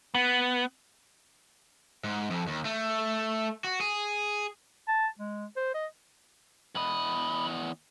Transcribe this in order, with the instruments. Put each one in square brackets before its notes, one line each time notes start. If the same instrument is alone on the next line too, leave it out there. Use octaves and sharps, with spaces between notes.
[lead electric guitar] B3
[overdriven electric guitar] G#2
F2
D#2
A3
F#4
G#4
[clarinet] A5
G#3
C5
D#5
[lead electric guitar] E2 D#5 [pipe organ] B5